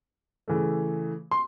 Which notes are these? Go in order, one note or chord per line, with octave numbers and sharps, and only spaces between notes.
C#3 E3 A3
C6